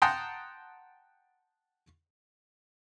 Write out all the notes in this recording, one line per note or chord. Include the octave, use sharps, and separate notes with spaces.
F#5 G5 A5 A#5 C6 D#6